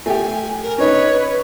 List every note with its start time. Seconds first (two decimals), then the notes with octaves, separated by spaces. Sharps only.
0.06 A3 G4 G#5
0.63 A#4
0.78 C#4 D#4 B4 C#5